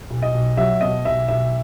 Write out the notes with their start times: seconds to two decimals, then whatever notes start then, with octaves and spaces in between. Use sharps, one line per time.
0.10 B1
0.22 D#5
0.34 B1
0.57 F#3 E5
0.81 B2 D#5
1.05 B1 E5
1.28 B1 E5